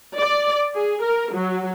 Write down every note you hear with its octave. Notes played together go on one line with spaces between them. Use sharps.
D5
G#4
A#4
F#3